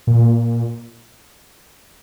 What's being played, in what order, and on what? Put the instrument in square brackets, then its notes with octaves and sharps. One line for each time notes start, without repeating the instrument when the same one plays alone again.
[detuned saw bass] A#2